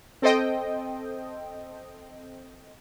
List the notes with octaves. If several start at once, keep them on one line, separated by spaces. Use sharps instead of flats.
C4 A4 C5 D#5 G5